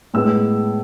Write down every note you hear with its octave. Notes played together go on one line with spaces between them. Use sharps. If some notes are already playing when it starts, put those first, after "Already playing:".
A2 G#3 B3 E6